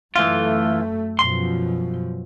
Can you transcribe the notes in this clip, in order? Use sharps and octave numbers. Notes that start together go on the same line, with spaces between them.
F#2 E3 A3 F4
F#2 B2 F3 C6